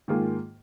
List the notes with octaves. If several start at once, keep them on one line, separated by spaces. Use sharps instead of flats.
G#2 D#3 A#3 F4 G#4